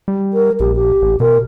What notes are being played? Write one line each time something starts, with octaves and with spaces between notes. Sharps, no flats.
G3
A#4
A#1 G4
G4
A1
B2 A#4